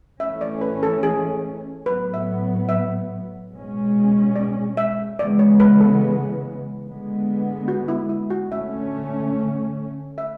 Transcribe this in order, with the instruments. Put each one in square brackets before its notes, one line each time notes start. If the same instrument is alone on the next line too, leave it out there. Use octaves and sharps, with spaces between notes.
[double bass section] E3 A3 C#4 [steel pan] E5
[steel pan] D5
B4
A4
G#4
[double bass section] A2 F#3 B3 [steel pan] B4
[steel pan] E5
E5
[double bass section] B2 G#3 C#4
[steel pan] D5
E5
[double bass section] C#3 E3 G#3 B3 [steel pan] D5
[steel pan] C#5
B4
A4
[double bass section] D3 G#3 B3
[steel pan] F#4
E4
E4
F#4
[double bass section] D3 A3 C#4 [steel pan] E5
[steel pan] E5